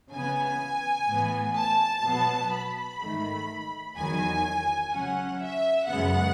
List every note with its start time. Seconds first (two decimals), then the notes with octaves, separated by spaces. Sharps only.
0.13 C#3 E3 B3 G#5
1.08 A2 E3 B3
1.56 A5
2.04 B2 F#3 B3
2.53 B5
3.00 G#2 D#3 A3
3.96 E2 D#3 F#3 G#5
4.92 C#3 F#3 C#4 F#5
5.40 E5
5.88 F#2 C#3 G#3 B3 F#5